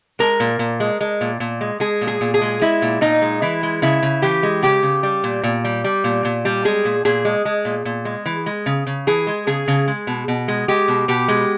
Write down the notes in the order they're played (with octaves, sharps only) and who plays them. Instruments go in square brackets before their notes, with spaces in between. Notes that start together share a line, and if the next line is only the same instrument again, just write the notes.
[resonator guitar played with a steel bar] G#3 A#4
A#2
A#2
G#3
G#3
A#2
A#2
G#3
G#3 G#4
A#2
G#4
A#2
G#4
G#3
G#3 E4
A#2
A#2 D#4
G#3
E3 E4
G#3
C#3 E4
C#3
E3 G4
G#3
C#3 G4
C#3
G3
A#2
A#2
G3
G3
A#2
A#2
G3
G#3 G#4
A#2
A#2 G#4
G#3
G#3
A#2
A#2
G#3
E3
G#3
C#3
C#3
E3 G#4
G#3
C#3 G#4
C#3
G#3
B2
B2
G#3
G#3 G4
B2
B2 G4
G#3